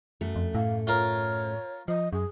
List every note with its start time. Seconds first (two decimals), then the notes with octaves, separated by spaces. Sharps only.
0.21 F#2 A3
0.36 F2
0.55 A2 F5
0.87 F4 A#4 C#5
1.88 F3 D#5
2.13 F#2 G#4